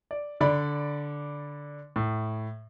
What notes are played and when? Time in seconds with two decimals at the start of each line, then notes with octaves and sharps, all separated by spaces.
0.11 D5
0.41 D3 D5 B5
1.96 A2